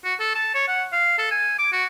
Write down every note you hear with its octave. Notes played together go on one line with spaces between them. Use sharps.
F#4
A4
A5
C#5
F#5
F5
A4
G#5
D6
F#4